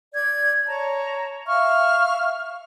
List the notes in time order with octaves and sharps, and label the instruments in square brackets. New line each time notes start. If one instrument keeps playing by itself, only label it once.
[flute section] D5 G#6
C#5 A5 A#5
E5 F5 C#6 F6